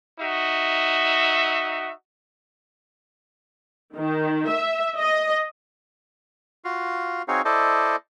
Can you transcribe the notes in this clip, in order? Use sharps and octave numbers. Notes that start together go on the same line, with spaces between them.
D#4 F#4 E5
D#3
E5
D#5
F4 F#4 F5
C4 D#4 F#4 G#4 C#5 F5
E4 A4 C5 D5 D#5